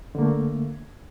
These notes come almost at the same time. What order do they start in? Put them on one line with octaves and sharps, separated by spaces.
D3 A#3 A3